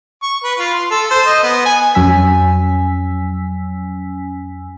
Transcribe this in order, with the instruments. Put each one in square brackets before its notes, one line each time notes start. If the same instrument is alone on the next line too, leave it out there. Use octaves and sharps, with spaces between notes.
[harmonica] C#6
B4
F4
C6
A4
C5
D#5
B3
G#5
[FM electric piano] F2 F#3 C#4 G#5 E6 B6